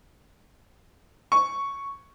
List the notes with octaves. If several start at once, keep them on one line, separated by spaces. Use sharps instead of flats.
C#6